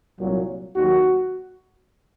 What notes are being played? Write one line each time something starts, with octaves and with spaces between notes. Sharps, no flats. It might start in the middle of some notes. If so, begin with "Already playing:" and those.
C2 A#2 F#3
D#2 D#3 F#3 F#4